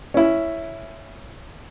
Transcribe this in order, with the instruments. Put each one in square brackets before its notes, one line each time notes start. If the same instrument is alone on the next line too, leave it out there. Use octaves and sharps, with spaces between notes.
[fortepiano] C#4 E4